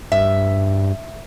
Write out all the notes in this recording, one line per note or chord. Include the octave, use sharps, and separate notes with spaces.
G2 E5